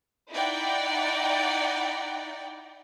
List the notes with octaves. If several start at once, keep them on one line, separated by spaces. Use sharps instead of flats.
D#4 E4 D5 F#5 G5